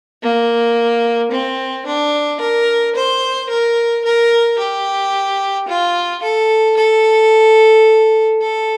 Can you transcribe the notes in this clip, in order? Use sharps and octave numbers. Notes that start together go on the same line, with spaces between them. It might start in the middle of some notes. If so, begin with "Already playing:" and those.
A#3
C4
D4
A#4
C5
A#4
A#4
G4
F4
A4
A4
A4